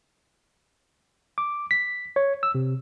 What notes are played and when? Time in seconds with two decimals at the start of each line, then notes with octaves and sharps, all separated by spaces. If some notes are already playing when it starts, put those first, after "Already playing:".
1.38 D6
1.71 B6
2.16 C#5
2.43 E6
2.55 C3